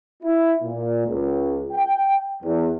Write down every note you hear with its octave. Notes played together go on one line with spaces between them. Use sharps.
E4
A#2
C#2
G5
E2